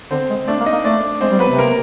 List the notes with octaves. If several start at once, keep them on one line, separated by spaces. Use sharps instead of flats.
D3 C4 C5
G#3
A3 D4 D5
A#3
D#4 D#5
A#3
A3 D4 D5
G#3 C4 C5
G3
F#3 B3 B4
C3
A#3 A#4